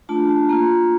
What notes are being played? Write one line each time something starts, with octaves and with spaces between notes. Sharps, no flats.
A3 D4 F4 A5
A5
A#3 F4 A#5